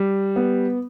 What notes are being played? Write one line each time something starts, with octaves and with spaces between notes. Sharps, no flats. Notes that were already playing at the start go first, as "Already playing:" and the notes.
Already playing: G3
B3